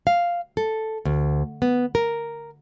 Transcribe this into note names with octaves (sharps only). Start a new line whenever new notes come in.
F5
A4
D2
B3
A#4